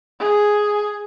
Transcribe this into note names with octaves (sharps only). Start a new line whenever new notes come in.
G#4